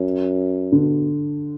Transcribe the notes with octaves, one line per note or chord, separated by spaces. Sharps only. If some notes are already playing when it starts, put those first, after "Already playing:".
Already playing: F#2
B2 D3